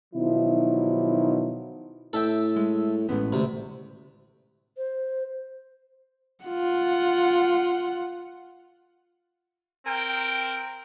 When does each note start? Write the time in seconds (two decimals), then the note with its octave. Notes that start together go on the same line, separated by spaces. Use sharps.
0.14 B2 D#3 F3 F#3 D#4 E4
2.13 A2 A4 E5 G5
2.56 G#3
3.09 A1 A2 G#3 B3
3.33 D2 C3
4.77 C5
6.46 F4 F#5
9.86 C4 A#4 G5